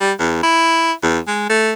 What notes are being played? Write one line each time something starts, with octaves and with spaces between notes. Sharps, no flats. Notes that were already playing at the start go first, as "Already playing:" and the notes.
G3
E2
E4
E2
G#3
A3